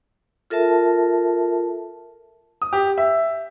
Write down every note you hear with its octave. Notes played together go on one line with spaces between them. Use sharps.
F4 A4 A#4 E5 A5
D#6
G4
E5